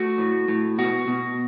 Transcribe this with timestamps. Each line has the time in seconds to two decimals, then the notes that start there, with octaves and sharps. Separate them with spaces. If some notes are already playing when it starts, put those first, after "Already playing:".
Already playing: A3 F#4
0.18 A2
0.48 A2
0.78 B2 F#4
1.08 B2